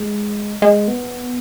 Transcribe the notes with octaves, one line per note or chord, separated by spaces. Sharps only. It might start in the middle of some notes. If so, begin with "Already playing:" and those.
Already playing: G#3
G#3
B3